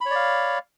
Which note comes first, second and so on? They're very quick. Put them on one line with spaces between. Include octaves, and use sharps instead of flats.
B5 C#5 D5 F5